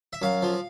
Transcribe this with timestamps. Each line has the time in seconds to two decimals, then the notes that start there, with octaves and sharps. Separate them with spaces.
0.13 E5
0.22 F#2 F5
0.43 F3